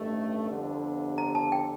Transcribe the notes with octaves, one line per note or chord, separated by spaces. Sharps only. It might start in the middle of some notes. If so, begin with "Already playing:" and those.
Already playing: A1 G2 D#3 A3
G1 F2 D3
A#5
A5
G5